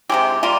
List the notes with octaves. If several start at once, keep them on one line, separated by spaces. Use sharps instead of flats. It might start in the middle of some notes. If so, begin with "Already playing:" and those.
C3 F3 G#3 G4
G3 A#3 F4